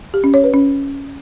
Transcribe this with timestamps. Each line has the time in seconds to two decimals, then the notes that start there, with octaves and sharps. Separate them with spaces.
0.14 G4
0.24 C#4
0.34 C#5
0.44 B4
0.54 C#4